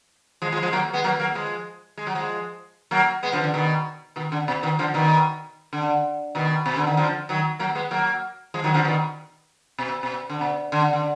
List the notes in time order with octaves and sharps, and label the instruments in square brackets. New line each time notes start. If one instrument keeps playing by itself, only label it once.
[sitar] F3 G#3
F3 G#3
F3 G#3
F#3 A#3
G#3 B3
F#3 A#3
F#3 A#3
F3 G#3
G#3
F#3
F3 G#3
F#3 A#3
G#3 B3
D3 F3
D3
B2 D#3
B2 D#3
D3
B2
B2 D#3
D3 F3
B2 D#3
D3
B2 D#3
B2
D3
D#3
D3 F3
D#3 F#3
F#3 A#3
G#3 B3
F#3 A#3
F3 G#3
D#3 F#3
D3 F3
B2 D#3
B2
B2
D3
B2
D3
D3